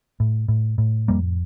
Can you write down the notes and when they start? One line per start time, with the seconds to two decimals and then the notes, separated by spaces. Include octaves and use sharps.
0.20 A2
0.48 A2
0.78 A2
1.08 F2 G3 A#3